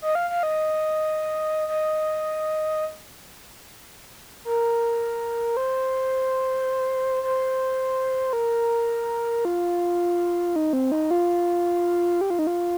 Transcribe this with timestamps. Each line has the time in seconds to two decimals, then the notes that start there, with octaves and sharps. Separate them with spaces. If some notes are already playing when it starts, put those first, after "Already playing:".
0.02 D#5
0.15 F5
0.30 F5
0.43 D#5
1.68 D#5
4.45 A#4
5.57 C5
7.23 C5
8.33 A#4
9.45 F4
10.56 D#4
10.73 C4
10.92 D#4
11.11 F4
12.21 G4
12.30 F4
12.39 D#4
12.47 F4